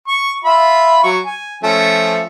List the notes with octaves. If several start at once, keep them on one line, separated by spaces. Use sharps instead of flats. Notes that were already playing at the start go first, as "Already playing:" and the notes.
C#6
F4 E5 B5
F#3 C#6
G#5
F3 A3 C#4